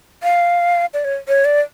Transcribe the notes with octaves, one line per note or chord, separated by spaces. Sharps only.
F5
D5
C#5
C#5
D5